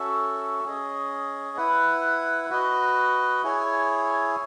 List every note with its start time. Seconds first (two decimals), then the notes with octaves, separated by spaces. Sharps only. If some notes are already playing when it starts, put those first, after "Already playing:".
Already playing: C#4 F#4 A4 E5
0.64 C#4 G#4 D#5
1.57 E4 B4 F#5
2.50 F#4 B4 D#5
3.43 E4 G#4 C#5 G#5